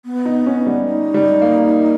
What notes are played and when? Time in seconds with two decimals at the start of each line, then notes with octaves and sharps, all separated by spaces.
0.05 B3
0.25 D#4
0.46 C#4
0.66 G3
0.87 D#4
1.14 G3
1.42 A#3